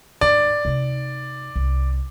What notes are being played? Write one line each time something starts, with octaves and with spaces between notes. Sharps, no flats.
G#2 D5
C3 D#4
C2